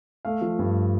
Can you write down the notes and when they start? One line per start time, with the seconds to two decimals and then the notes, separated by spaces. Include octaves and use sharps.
0.25 A3 F5
0.42 F3
0.59 G2